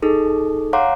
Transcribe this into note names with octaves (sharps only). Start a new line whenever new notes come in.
D#4 G#4 A4
C#5 F5 F#5 A#5 C6 D6